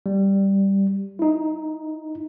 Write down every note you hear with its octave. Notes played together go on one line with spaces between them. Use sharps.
G3
D#4 E4